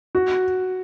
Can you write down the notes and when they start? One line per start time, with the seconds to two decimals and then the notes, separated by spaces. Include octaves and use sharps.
0.15 F#4